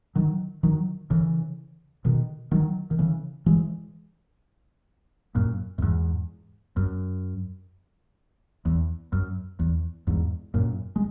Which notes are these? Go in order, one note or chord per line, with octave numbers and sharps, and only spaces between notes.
D#3 F#3
D#3 F#3
C#3 E3
B2 D#3
D#3 F#3
D#3
C#3 E3
E3 G#3
F#2 A#2
F#2
E2 G#2
F#2
E2
F#2
E2
E2 G#2
F#2 A#2
G#3